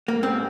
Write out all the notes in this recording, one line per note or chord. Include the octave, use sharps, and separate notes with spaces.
A#3
G#2 G3 C4